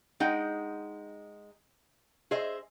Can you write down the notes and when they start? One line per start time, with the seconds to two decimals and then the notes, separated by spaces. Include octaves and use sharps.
0.20 G#3 D#4 D#5 F#5 G5
2.31 G#4 C5 D#5 E5